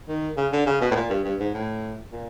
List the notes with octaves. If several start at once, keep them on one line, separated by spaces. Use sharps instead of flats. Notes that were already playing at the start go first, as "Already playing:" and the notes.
D#3
C#3
D3
C#3
B2
A2
A#2
G2
G2
G#2
A2
A#2